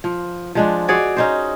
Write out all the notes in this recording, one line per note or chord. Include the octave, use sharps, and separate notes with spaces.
F3
F3 G#3 D4
F#4 G#4 C#5 D5
C#4 D#4 C5